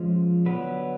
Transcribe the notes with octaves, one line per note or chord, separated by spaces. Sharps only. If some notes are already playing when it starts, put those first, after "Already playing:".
Already playing: F3 G#3 C#4
D3 F#3 B3 B4